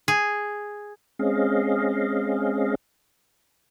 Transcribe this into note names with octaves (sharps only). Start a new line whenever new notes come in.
G#4
G#3 C4 C#4 G#4 D#5 F5